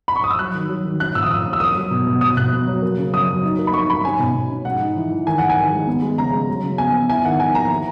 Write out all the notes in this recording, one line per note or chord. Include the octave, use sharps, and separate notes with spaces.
B5
C#6
D#6
E6
F#3 F#6
D#3
F#3
D#3
C#4 F#6
A#2 E6
D#6
A#2 E6
C#4
E6
A#3 D#6
F#3
B2
B2
B2 D#6
B2 F#6
B3
F#3
A#3
C#3
F#2 D#6
F#3
D#4
A#3
B5
D#4 C#6
D#4 B5
C#4 G#5
B2
B2
C#4
G#2 F#5
D#4
E3
E3
D#3 G#5
D#3 F#5
G#5
D#3
G#3
B3
G#3
C#3 A#5
G#3
F#3
C#3
B3 G#5
B3
E4 G#5
D#3 F#5
D#3 G#5
A#3 A#5
E4